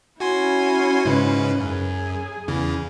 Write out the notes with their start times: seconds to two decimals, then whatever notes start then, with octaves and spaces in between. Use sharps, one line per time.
0.20 C#4 E4 F#4 G#5 C6
1.05 G#2 C#3 B4
1.61 F#2 G#4
2.48 E2 C#3 E3